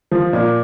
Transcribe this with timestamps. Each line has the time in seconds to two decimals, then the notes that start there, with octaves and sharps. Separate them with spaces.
0.11 F3
0.33 A#2